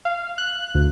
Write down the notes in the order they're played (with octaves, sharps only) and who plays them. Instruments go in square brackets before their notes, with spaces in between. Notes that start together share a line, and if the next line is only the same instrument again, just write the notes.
[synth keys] F5
F#6
D2